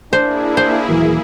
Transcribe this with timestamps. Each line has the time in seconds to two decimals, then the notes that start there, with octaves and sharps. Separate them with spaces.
0.13 A#3 D4 E4 G#4 C5
0.57 C5
0.88 D#1 E3 F#3